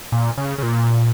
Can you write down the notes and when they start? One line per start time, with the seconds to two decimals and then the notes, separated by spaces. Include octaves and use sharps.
0.12 A#2
0.38 C#3
0.58 C#3
0.63 A#2